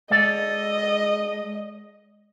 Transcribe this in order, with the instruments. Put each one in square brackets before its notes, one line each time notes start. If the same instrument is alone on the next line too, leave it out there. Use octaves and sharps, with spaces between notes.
[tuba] G#3 [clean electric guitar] A4 D5 [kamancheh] D#5